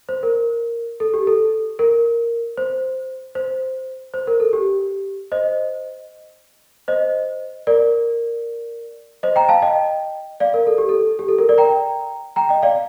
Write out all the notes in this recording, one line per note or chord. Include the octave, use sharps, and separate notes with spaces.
C5
A#4
A4
G4
A4
A#4
C5
C5
C5
A#4
A4
G4
C5 D#5
C5 D#5
A#4 D5
C5 D#5
G5 A#5
F5 A5
D#5 G5
D5 F5
A#4
A4
G4
A4
G4
A4
A#4
A#4 D5
G5 A#5
G5 A#5
D#5 G5
D5 F5